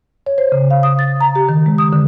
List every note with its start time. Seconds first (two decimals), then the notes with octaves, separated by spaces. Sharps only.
0.26 C#5
0.38 C5
0.52 C#3
0.70 F5
0.83 D#6
0.99 A6
1.21 A#5
1.35 G4
1.49 D#3
1.66 G#3
1.78 D#6
1.93 D3